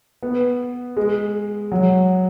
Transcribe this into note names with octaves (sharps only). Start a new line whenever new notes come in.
B3
G#3
F#3